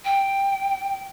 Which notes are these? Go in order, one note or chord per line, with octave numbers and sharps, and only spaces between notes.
G5